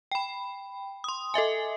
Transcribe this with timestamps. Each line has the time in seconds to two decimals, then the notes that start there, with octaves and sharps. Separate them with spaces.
0.11 G5 B5
1.04 C6 D#6
1.34 A4 D#5 E5 G#5